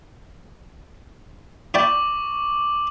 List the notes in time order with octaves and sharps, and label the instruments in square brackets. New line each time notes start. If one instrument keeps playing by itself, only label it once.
[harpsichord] E4 D5 G5 [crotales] C#6 D6 F#7